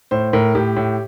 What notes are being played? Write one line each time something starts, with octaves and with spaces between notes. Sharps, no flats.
A2 C5
A2 A#4
A2 G4
A2